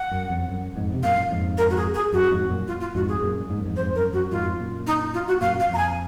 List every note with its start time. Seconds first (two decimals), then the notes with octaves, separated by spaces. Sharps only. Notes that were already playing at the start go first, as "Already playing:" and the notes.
Already playing: F#5
0.11 F#2
0.30 F2
0.48 F#2
0.76 F2 G#2
0.94 C3
1.03 F#2 A#2 F5
1.30 F2 G#2
1.58 A#4
1.70 F#4
1.77 G#4
1.94 G#4
2.13 F#2 F#4
2.31 F2 G#2
2.49 F#2 A#2
2.68 F4
2.81 F4
2.95 F2 G#2 F#4
3.09 G#4
3.22 F#2 A#2
3.50 G#2
3.58 F#2
3.66 F2 G#2
3.76 F2 G#2 C5
3.95 F#2 A#4
4.13 F#2 F#4
4.31 F2 G#2 F4
4.59 F#2 A#2
4.87 D#4
5.14 F4
5.28 F#4
5.41 F#2 A#2 F5
5.60 F5
5.69 F2 A#5
5.78 G#5